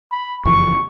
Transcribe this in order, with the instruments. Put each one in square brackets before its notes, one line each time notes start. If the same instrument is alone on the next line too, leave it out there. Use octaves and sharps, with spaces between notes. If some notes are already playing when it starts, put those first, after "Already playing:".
[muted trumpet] B5
[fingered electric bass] F#1 F2 E3 [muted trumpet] C#6